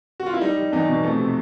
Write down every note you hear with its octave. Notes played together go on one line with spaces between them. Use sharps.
F#4
F4
E4
G3 D#4
G3
E2 D#4
B2
F2 A3
C3